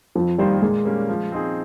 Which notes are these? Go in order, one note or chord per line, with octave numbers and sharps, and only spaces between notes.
F2 F3
D#3 G3 A#3 F4 C5
A#2 G#3
G3 A#3 C#4
F3
C4 D#4 G#4